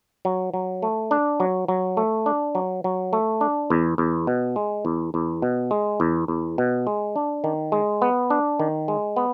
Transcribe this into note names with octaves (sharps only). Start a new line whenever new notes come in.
F#3
F#3
A3
D4
F#3
F#3
A3
D4
F#3
F#3
A3
D4
E2
E2
B2
G#3
E2
E2
B2
G#3
E2
E2
B2
G#3
D4
D#3
G#3
B3
D4
D#3
G#3
B3